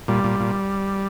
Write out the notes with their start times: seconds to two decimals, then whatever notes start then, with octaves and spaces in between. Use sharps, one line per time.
0.08 A#2 G3
0.24 A#2
0.40 A#2